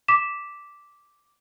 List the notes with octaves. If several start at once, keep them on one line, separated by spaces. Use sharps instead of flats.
D6 B6 E7